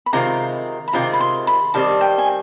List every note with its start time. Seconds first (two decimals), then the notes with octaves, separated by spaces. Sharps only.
0.06 B5
0.13 C3 D#3 G#3 C4 F4 A#5
0.88 B5
0.93 C3 D#3 G#3 C4 F4 A#5
1.13 B5
1.20 C6
1.47 B5
1.74 D#3 G3 C4 A5
2.01 G5
2.18 G#5